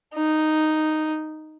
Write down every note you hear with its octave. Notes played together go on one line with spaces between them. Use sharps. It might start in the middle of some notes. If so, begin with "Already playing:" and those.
D#4